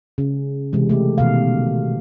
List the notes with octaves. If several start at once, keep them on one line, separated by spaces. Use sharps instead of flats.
C#3 C#4
C3 E3 G#3
A3 G4
B2 D#3 F5